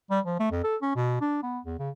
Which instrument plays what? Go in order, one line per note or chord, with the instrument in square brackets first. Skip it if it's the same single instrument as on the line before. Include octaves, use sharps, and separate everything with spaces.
[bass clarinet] G3
F3
A3
F2
A4
C#4
B2
D4
B3
E2
C#3